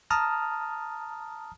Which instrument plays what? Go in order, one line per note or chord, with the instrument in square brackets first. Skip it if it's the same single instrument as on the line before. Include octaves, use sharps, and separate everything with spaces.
[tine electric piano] A5 A#5 D#6 F6